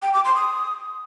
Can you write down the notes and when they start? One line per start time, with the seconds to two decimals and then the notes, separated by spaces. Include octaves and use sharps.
0.02 G5
0.13 D6
0.25 C6
0.36 D#6